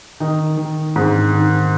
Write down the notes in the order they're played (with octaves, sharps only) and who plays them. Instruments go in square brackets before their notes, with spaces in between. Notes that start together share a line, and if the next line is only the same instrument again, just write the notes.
[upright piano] D#3 D#4
D#3
G#2
D#3